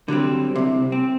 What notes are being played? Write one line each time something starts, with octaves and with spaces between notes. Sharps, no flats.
D3 F#3 G3 C4
C2 C3
C4